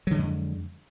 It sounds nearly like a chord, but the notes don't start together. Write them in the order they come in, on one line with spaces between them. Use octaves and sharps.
F#3 D3 G#3 F2